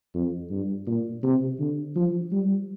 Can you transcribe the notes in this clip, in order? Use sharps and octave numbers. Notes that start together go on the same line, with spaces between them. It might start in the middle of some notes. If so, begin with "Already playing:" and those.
F2
G2
A#2
C3
D3
F3
G3